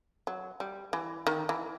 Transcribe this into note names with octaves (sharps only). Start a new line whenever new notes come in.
F#3
G3
E3
D#3
E3